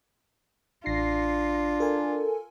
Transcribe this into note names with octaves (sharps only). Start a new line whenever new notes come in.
A1 D4 F4 A#6 C7
A4 A#4 G#5